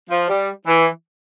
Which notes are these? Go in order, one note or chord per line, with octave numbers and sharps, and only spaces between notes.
F3
G3
E3